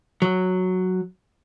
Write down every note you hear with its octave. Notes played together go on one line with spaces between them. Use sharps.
F#3